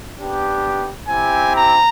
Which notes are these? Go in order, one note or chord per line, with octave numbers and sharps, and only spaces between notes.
B3 D4 G4
C4 E4 G4 G#5
A#5